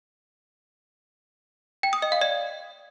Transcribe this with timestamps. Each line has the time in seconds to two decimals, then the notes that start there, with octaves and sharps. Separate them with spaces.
1.83 G5
1.93 D#6
2.02 D#5
2.12 F5
2.21 D5